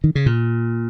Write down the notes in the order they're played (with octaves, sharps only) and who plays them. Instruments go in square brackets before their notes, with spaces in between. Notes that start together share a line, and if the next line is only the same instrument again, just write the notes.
[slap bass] D#3
C#3
A#2